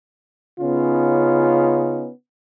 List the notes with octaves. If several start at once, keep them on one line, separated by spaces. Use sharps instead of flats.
C#3 B3 C#4 D#4 F4